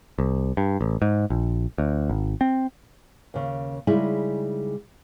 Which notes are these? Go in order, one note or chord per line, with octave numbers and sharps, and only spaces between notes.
C2
G2
A1
G#2
A#1
D2
G#1
C4
D#2 C#3
C#3 G3 G#3 D#4 E4 G#4